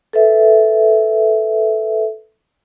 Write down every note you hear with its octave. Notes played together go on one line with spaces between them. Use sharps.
A4 B4 E5